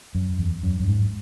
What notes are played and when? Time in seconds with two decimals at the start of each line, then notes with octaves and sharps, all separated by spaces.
0.15 F#2
0.39 E2
0.63 F#2
0.80 F#2
0.88 G#2